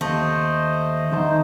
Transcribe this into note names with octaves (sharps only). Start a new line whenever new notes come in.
D#2 A3 C5 D#5
E2 D3 D#3 D#4 C5 A5 G6